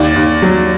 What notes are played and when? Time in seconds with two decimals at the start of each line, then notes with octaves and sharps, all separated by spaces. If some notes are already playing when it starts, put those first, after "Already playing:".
Already playing: D#2 D5
0.16 D#2
0.42 F#3